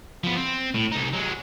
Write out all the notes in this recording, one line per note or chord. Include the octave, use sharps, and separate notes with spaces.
F3 B3
C4
A2
C2 D#4
F#3 G#3